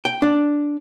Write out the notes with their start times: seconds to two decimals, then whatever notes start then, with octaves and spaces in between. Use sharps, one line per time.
0.05 G5
0.22 D4